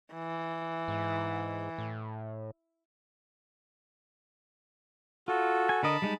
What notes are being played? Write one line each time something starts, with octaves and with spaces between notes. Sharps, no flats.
E3
G#2
A2
F4 F#4 A4
G#5
D3 A#4 D#5 A5 B5
G3 G#3 D#4